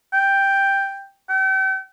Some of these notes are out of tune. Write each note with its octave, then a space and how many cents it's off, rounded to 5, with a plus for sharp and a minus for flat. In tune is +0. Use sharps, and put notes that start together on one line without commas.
G5 +5
G5 -40